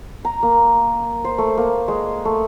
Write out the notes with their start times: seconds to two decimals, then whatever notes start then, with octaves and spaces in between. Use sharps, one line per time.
0.25 A#5
0.43 A#3
1.24 C5
1.38 A3
1.57 A#3
1.88 G#3
2.25 A3